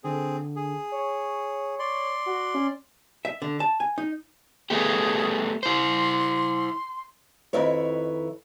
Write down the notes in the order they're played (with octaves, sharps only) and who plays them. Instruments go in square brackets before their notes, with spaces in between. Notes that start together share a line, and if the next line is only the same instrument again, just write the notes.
[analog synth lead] D3 [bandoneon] C4 G#4
[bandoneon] G#4
[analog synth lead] C#5
[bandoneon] D5 C6
[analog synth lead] F#4
C#4
[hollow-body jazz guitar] E5
D3
A5
G#5
D#4
[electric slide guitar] A3 B3 G4 [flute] G#4
[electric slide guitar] E4 C5 [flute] C6
[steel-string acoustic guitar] F2 D#3 E4 B4 C#5